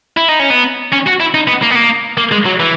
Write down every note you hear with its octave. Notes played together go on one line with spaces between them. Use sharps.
E4
D#4
C#4
B3
C#4
F#4
E4
D#4
B3
A#3
B3
A#3
A#3
G#3
F#3
E3